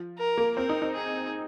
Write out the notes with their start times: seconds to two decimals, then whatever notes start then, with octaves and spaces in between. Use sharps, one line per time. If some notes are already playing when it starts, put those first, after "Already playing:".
Already playing: F3
0.18 A#4
0.38 A#3
0.57 C4 A#4
0.69 D#4
0.82 D#4
0.94 G#4